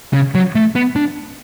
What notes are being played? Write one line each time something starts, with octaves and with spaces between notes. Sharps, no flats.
C#3
F#3
A3
B3
D4